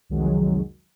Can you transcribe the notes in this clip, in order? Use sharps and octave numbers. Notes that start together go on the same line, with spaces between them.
C2 F2 D#3 F#3 G#3